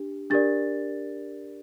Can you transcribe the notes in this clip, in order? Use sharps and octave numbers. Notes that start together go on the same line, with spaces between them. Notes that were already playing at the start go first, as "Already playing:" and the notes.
Already playing: D4 G4
D4 G4 A#4 D5 A6